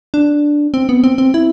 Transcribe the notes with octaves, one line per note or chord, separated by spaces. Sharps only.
D4
C4
B3
C4
C4
E4